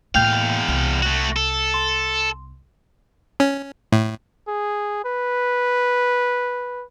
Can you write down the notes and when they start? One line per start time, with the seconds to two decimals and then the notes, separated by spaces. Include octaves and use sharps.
0.15 E2 A2 A#3 F5 G5 G6 F7
0.68 C2
1.02 A3 F#4
1.36 A4
1.74 C6
3.40 C#4
3.92 A2
4.48 G#4
5.05 B4